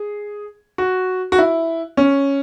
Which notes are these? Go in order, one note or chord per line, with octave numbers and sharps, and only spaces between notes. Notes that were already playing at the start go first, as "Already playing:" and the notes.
Already playing: G#4
F#4
F#4
E4
C#4